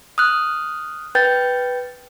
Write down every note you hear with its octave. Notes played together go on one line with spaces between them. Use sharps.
D#6 F6 F#6
B4 G5 G6 A6